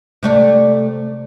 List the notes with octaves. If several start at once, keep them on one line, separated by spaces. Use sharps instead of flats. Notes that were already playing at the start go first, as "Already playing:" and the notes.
C3 A3 D5